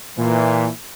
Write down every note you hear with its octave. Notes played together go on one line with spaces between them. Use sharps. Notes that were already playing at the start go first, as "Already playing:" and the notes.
A#2 E3